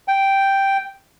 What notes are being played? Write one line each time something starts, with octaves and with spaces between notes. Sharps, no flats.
G5